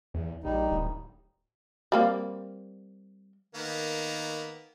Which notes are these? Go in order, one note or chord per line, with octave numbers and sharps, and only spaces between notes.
E2
A#1 G3 D#4
D1
G3 A#3 C4
D#3 A#3 B3